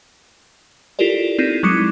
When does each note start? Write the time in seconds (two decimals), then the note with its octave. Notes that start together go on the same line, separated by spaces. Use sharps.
0.99 E4 F4 G4 A4 A#4 D5
1.39 C4 D#4 E4
1.63 F#3 G#3 E4 D6 C#7